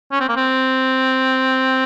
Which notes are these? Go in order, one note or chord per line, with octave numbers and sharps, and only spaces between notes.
C#4
C4
A#3
C4